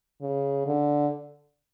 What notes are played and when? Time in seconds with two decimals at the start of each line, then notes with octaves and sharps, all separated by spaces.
0.21 C#3
0.66 D3